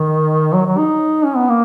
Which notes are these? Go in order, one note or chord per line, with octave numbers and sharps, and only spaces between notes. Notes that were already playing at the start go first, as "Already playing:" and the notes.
Already playing: D#3
F#3
F#3
D#4
C#4
B3
A#3